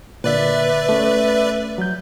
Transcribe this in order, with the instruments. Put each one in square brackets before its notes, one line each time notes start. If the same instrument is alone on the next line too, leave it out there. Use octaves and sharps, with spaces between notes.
[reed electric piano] A#2 D3 [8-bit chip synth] B4 D5 E5
[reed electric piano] A3 C#4
F#3 G6